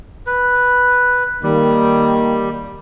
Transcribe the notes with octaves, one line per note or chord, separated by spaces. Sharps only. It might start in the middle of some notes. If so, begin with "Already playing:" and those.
B4
D#3 G3 A#3